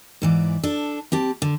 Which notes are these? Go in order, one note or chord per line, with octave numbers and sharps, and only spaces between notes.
G#2 E3 D5
D4 A4
C4 G4 A5
D3